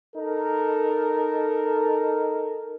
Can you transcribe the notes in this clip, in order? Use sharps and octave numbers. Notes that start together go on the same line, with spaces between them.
D#4 A4 A#4